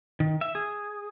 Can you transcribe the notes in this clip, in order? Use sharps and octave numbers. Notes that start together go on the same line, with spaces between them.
D#3
E5
G#4